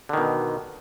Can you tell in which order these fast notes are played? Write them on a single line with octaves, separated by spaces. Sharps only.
D3 D#3 B2